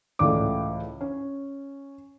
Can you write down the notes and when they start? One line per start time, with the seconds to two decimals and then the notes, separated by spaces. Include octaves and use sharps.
0.19 C#2 A2 E3 D5 D6
1.01 C#4